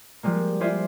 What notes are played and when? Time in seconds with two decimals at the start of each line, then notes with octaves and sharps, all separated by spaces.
0.23 F3 G3 G#3 A#3
0.60 E4 F4 G#4 C5 D5 E5